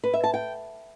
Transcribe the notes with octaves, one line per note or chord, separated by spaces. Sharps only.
B4
E5
A5
G5